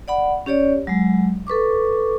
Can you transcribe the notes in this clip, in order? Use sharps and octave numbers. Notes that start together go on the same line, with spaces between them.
D5 F#5 B5
C#4 G4 C#5 D5
F#3 G#3
A4 B4 C#6 D6